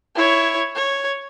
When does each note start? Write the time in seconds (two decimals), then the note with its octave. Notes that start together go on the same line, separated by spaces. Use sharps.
0.15 E4 C#5
0.75 C#5